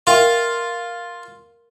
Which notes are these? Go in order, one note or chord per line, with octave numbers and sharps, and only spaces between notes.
F4 A#4 E5 G5